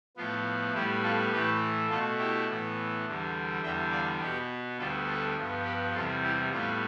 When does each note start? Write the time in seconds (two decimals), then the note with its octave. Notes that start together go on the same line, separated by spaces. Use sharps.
0.16 A2 F3 B3 F4
0.74 A2 G3 B3 E4 G4
1.03 F4 A4
1.32 A2 E3 A3 G4 B4
1.89 B2 A3 F4 A4
2.19 E4 G4
2.48 A2 E3 B3
3.05 E2 D3 G3
3.63 E2 D3 G3 E5 G5
3.91 D5 F5
4.20 B2 B3 G4 B4
4.78 D2 D3 G3 B3 F4 A4
5.07 F4 A4
5.37 G2 F3 B3
5.65 G4 B4
5.94 E2 C3 G3 F4 A4
6.23 E4 G4
6.51 A2 G3 B3 F4